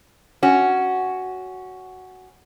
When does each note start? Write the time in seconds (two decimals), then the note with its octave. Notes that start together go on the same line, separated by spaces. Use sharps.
0.43 C#4 F#4